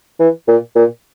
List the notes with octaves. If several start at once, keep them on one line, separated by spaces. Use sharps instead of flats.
E3
A#2
A#2